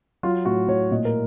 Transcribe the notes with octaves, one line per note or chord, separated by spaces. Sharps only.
F#3 F4
A2 F#4
A2 C#5
A#2 D#5
A#4